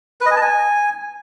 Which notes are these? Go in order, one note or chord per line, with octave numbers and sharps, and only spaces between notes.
B4
D#5
G#5
A5
G#5